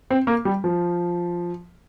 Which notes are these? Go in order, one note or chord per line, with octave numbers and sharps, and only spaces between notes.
C4
A#3
G3
F3